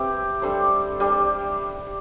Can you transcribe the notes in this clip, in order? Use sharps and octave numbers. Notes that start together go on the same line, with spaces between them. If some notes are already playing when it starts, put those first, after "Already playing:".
Already playing: C4 G4 B4 E5
G3 D4 A4 C5
G3 D4